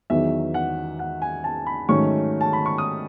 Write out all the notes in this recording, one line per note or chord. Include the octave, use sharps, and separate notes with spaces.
E2 D#3 F#3 B3 D#4 E5
F#5
F#5
G#5
A5
B5
G#2 D#3 F#3 A3 C#4 C#6
A5
B5
C#6
D#6